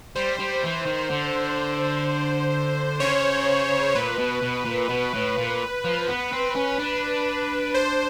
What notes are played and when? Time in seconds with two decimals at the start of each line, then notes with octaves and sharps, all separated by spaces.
0.15 G3 C5
0.39 G3
0.64 E3
0.86 D#3
1.10 D3
3.00 C#3 C#5
3.95 A#2 B4
4.19 B2
4.43 B2
4.65 A#2
4.90 B2
5.14 A2
5.38 A#2
5.84 F3
6.08 B3
6.32 C4
6.55 C#4
6.79 D4
7.74 C5